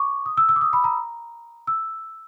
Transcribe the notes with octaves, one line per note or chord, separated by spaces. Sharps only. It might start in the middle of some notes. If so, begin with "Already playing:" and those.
Already playing: C#6 D6
D#6
E6
E6
D6
D#6
B5
A#5
E6